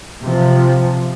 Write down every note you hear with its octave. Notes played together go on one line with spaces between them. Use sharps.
C3 F3